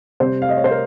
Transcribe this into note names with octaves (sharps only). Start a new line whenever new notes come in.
C3 G3 C5
F5
D#5
C#5
C5
A#4